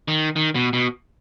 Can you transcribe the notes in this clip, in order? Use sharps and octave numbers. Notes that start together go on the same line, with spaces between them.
D#3
D#3
B2
B2